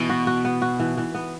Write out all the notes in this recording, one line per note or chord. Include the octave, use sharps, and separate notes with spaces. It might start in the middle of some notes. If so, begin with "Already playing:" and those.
Already playing: B2 E3
F#4
F#4
B3
F#4
E3
E3
B3